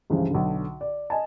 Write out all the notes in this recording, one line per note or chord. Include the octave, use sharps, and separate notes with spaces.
C#2 G2 C#3 E3 F3
B1 D3
D5
D#5 G#5 A5